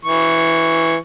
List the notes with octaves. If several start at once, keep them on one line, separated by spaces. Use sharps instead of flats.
E3 C#6